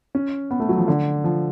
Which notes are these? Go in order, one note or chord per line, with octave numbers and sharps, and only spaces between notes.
C#4
B3
A3
F#3
F3
D3
F3